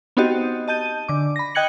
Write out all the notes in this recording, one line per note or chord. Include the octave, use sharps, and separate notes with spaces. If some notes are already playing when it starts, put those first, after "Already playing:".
B3 C4 D#4 F#4 G4 D#5
D#5 A5 G6 D#7
D3 D6
B5 A#6
D#5 G5 F#6 G#6 C#7 F#7